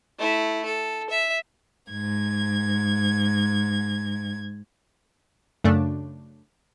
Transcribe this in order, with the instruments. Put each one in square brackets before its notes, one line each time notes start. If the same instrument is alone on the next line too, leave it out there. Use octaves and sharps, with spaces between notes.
[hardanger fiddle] A3 E4
A4
E5
[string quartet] G#2 G#6
[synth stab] F#2 C#3 A3 D4